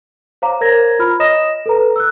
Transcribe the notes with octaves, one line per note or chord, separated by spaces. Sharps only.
C5 C#5 F5 A#5 D6
A#4 C5 C#5 A#5 G#6 A#6
F4 A#5 B5 F6
C#5 D#5 D#6 A#6 E7
A4 B4 A#5
E6 F#6